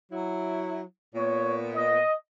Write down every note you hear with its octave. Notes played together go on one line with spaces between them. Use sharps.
F#3 E4
A#2 B3 C#5
D#5